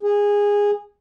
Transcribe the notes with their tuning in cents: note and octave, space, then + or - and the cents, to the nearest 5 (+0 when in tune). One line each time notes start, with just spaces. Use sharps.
G#4 -15